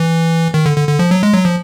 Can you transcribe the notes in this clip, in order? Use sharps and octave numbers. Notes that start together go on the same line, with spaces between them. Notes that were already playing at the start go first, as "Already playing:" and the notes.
Already playing: E3
D#3
D3
D3
D3
F3
F#3
G#3
F#3
F3